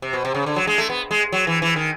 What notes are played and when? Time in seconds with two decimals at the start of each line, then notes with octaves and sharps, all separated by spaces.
0.02 C3
0.13 B2
0.25 C3
0.34 C#3
0.46 D3
0.56 F#3
0.67 G#3
0.78 A3
0.90 B3
1.11 G#3
1.32 F#3
1.47 E3
1.62 E3
1.76 D#3